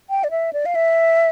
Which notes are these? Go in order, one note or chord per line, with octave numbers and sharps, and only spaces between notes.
G5
D5
E5
D5
F5
E5